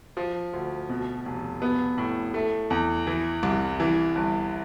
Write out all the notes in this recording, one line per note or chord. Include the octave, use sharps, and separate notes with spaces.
F3
D2
B2
F1
B3
A2
A3
E2
E3
C2
E3
G1